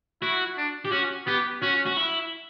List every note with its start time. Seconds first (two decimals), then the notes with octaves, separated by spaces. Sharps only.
0.22 E4 F#4
0.57 D4
0.85 G4
0.92 C#4 F#4
1.27 B3 G4
1.62 C#4 F#4
1.86 F#4
1.97 E4